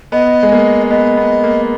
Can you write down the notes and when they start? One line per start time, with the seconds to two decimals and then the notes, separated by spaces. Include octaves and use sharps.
0.12 B3 D#5
0.43 G#3
0.52 A#3
0.90 B3 D#5
1.17 B3
1.43 A#3